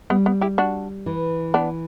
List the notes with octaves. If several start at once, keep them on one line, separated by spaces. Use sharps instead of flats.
G3 B3
B3
E4 G4
D4 F#4
E3
B3 D4